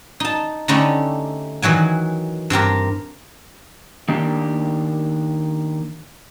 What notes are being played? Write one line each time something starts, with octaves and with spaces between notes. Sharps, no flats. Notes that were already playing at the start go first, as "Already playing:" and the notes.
D#4 A5
D3 A3 C#4 D#4 E4 G4
D#3 E3 F#3 G#5
G2 C4 G4 A#4
D#3 A#3 D4 G4